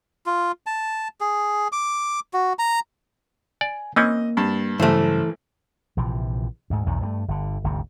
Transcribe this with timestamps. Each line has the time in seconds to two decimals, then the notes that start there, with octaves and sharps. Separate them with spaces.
0.26 F4
0.66 A5
1.21 G#4
1.72 D6
2.33 F#4
2.59 A#5
3.61 D5 G#5
3.96 E3 A#3 C4 C#4 D#5
4.37 G2 A5
4.80 A1 G2 C#3 E3 F#3 A3 C5
5.97 A#1 C3 E3 F3
6.70 D2 G#2
6.86 B1 E2 D#3 F#3
7.01 G2 F#3 A3
7.28 G1 D3
7.64 G1 D2 G#2 C3